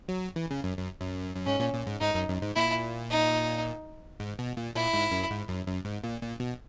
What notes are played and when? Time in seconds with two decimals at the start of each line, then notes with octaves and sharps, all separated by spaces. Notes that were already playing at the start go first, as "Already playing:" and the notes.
0.08 F#3
0.36 E3
0.51 C#3
0.64 F#2
0.77 F#2
1.00 F#2
1.36 F#2
1.46 G#2 C#4
1.59 A#2
1.74 A#2
1.87 G#2
2.01 G#2 D#4
2.14 F#2
2.28 F#2
2.42 G#2
2.56 A#2 E4
3.11 D#4
4.20 G#2
4.39 B2
4.57 A#2
4.75 A#2 E4
4.93 G#2
5.12 F#2
5.30 G#2
5.48 F#2
5.67 F#2
5.85 G#2
6.04 A#2
6.22 A#2
6.40 B2